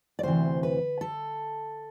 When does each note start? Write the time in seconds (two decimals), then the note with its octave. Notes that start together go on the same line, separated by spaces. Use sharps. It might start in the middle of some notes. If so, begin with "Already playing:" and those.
0.19 D5
0.23 D2 C3 E3 C5
0.63 B4
1.01 A4